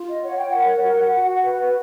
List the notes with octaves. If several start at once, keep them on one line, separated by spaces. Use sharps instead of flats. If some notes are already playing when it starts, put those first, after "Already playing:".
Already playing: F4
D#5
C#5 F#5
G5
A#4 F#5
F#4
F#4
B4